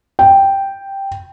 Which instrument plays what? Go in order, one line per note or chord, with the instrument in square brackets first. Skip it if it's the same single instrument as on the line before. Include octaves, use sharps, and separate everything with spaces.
[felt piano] G5